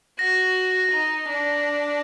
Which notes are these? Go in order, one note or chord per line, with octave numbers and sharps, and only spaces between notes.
F#4 A#6
D#4
D4